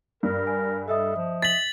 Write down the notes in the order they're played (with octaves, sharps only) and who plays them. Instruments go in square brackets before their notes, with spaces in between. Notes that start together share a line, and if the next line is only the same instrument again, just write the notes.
[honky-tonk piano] G2 [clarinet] A#4
[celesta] G#5
[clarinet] A4 [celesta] D#5 E5 D#6
[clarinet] F3
[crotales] A6 F#7 [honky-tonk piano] B6